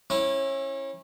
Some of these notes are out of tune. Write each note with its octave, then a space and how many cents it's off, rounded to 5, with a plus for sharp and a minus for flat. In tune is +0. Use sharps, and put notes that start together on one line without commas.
C#4 -30 E4 +0